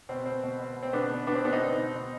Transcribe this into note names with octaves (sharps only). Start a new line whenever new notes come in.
B2 C4
B2 C4
B2
B2
B2
C4
B2 B3 D4
B2
B2 B3 D4
C4
B2 B3 D4
C4 D#4
B2
B2
B2